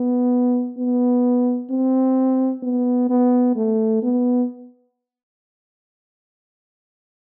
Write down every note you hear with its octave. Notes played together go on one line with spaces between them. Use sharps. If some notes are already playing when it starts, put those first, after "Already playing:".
Already playing: B3
B3
C4
B3
B3
A3
B3